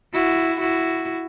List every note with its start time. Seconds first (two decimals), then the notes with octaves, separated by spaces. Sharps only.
0.14 E4 F#4
0.60 E4 F#4